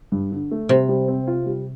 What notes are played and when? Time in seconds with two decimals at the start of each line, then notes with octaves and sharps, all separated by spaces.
0.12 G2
0.31 D3
0.51 A3
0.69 C3 G3
0.89 G3
1.08 C4
1.27 F4
1.46 G3